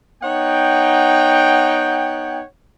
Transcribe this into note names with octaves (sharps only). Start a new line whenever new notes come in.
B3 D#4 C#5 F#5 G5